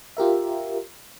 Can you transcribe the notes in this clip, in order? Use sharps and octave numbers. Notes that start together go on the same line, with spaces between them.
F4 G4 A#4 E5